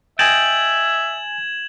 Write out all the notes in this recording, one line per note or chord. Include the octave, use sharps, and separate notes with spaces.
D#5 E5 G5 G#5 G#6 A6 E7 F#7